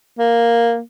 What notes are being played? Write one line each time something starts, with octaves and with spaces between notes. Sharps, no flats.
A#3